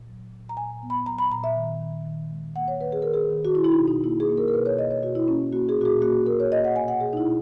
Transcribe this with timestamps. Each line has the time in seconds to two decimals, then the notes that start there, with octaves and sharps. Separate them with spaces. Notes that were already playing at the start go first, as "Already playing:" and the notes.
Already playing: A#2
0.08 F#3
0.33 A#2
0.49 A#5
0.57 A#2 G#5
0.83 B3
0.90 B5
1.06 F#3 A#5
1.19 B5
1.31 A#2 A#5
1.44 E5
1.56 D#3
1.81 D#3
2.05 D#3
2.31 G#3
2.55 A#3 F#5
2.68 C#5
2.80 D#3 B4
2.92 G#4
3.02 D#3 A#4
3.13 G#4
3.30 D#3
3.45 F#4
3.54 B2 E4
3.64 E4
3.71 D#4
3.79 B2
3.88 D#4
4.03 A#3 E4
4.20 G#4
4.29 A#3
4.38 A#4
4.48 A#4
4.54 B2 B4
4.66 C#5
4.78 A#3 D#5
4.91 C#5
5.03 B2 F#4
5.15 E4
5.28 A#3 C#4
5.53 A#3 F#4
5.69 G#4
5.77 A#2 F#4
5.85 G#4
6.02 A#3 F#4
6.26 A#3 A#4
6.40 C#5
6.51 A#3 D#5
6.65 F#5
6.76 B2 G#5
6.88 F#5
7.01 B2 G#4
7.13 D#4
7.17 E4
7.26 B2